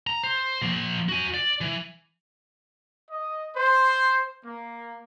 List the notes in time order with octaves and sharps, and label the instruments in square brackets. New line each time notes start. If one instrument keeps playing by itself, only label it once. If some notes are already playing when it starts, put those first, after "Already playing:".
[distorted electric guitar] A#5
C5
F3 A#3
F#4 G#5
D5
E3
[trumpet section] D#5
C5
A#3